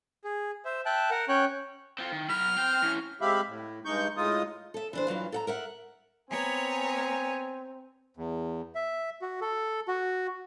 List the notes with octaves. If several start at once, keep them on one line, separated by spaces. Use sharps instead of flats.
G#4
C5 E5
E5 G5 A5 F#6
A#4 F#5
C#4 C#5 G5 F#6
C4 F4
D#3
F#3 B5 F6
C4 G5
E3 C#4
G#3 C4 G4 E5 F5 B5
A2
G2 G#3 D#4 C#6 G6
A2 G#3 D#4 F4 D#6
A4 E5
E3 D4 C5
G2 E3 F#3 F4
A4 F#5 A#5
A#4 E5 F#5
B3 C4 C#5 G#5 A#5
E2
E5
F#4
A4
F#4